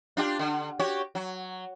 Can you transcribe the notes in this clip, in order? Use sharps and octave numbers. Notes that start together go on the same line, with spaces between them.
D4 F4 G4
D3
F#4 G4 C#5
F#3